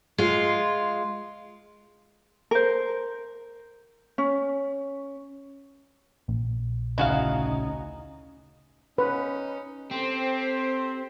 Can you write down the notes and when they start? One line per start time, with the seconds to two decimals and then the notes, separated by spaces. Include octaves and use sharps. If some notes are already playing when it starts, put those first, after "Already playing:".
0.18 G#3 F4
2.51 A#4 C5
4.18 C#4
6.28 A#1
6.98 D2 C#3 D#4 E4 F#4 F5
8.98 C#4 D#4 B4
9.91 C4 G4 A4 C5